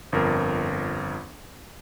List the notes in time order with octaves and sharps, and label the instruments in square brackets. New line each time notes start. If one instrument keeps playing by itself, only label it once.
[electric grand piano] G1 F2 A#4